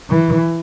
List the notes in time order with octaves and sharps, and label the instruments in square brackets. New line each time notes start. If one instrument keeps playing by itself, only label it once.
[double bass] E3